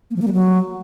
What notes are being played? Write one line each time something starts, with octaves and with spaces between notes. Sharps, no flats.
A#3
F3
A#3
G3
F#3